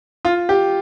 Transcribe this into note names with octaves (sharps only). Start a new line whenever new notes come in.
F4
G4